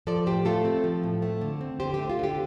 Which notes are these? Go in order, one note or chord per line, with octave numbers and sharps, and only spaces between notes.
F3 A4 D5
A2 G4 C5
A3 F4 A4
C4
F3
A2
A3
D3
C4
D3 G4 C5
A3 G4
F4
D3 G4